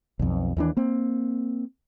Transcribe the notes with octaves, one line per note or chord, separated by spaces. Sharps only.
B1 F2
D#2 E3 D4
A#3 C4